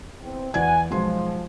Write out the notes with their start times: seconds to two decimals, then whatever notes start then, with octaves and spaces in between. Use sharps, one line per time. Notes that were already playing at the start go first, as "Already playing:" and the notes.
0.21 E2 C4
0.54 E2 D5 F#5 G#5 G#6
0.91 B1 F3 G#3 C6